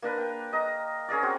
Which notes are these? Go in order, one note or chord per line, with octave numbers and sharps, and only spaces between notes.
A#3 D4 A#4 B4
G5
D#5 A#5
C#4 G#4 A#4 D5
C4 F#4